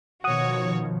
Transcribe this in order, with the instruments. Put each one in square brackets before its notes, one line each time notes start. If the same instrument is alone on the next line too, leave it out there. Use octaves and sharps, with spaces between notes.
[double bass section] B2 D#3 F3 [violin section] F#4 C#5 [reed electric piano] F#5 D#6